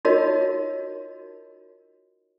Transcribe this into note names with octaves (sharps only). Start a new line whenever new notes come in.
D#4 F4 F#4 A#4 C#5 D#5